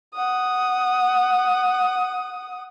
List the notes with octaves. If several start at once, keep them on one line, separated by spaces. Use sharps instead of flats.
F#5 D#6